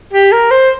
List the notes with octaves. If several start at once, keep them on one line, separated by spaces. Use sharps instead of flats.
G4
A#4
C5